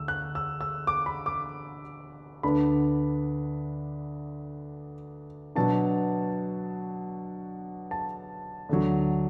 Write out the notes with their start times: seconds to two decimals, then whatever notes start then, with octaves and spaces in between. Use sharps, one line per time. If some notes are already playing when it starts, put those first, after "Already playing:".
Already playing: D2 D3 A3 D4 E6
0.08 F#6
0.35 E6
0.61 E6
0.87 D6
1.06 B5
1.26 D6
2.43 D2 D3 B3 D4 B5
5.55 B2 F#3 B3 D4 A5
7.91 A5
8.69 D2 D3 F#3